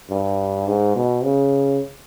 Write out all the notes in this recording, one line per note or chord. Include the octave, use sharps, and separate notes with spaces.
G2
G#2
B2
C#3